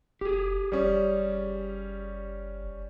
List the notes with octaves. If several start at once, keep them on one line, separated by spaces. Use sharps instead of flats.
F1 G4 G#4
F#1 G3 C#4